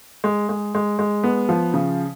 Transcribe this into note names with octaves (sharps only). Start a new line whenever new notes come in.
G#3
G#3
G#3
G#3
B3
F3
C#3